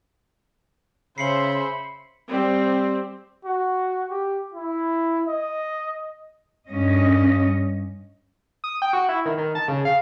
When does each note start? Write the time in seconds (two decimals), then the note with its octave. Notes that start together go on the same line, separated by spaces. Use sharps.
1.18 C#3 C5 E5 B5 C7 C#7 F#7
2.29 G3 C4
3.45 F#4
4.10 G4
4.54 E4
5.28 D#5
6.69 G2 C#4 D#5
8.64 D#6
8.82 G5
8.93 F#4
9.09 E4
9.25 D#3
9.38 D#3
9.55 A5
9.68 C#3
9.85 F5